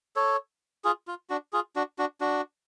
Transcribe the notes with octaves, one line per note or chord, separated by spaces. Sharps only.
A4 C#5
F4 G#4
F4
D4 F#4
F4 G#4
D4 F#4
D4 F#4
D4 F#4